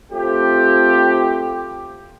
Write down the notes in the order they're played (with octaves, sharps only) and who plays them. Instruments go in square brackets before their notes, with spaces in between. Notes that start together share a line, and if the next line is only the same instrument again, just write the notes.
[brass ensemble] A3 C4 F4 G4